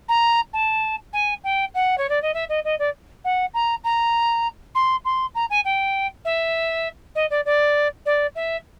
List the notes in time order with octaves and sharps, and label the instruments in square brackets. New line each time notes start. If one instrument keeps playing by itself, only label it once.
[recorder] A#5
A5
G#5
G5
F#5
C#5
D5
D#5
E5
D#5
D#5
D5
F#5
A#5
A#5
C6
C6
A#5
G#5
G5
E5
D#5
D5
D5
D5
E5